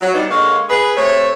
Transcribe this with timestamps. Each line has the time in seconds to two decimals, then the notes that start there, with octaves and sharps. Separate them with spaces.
0.02 F#3
0.14 F3 G3 B3 D4 D#4
0.31 D3 G#3 A#3 C#5 D#5 F5
0.69 G#4 B4
0.96 C3 A3 C4 C#5